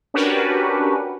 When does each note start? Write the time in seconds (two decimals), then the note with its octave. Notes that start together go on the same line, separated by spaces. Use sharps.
0.14 C#4 D4 F#4 G4 A#4 B4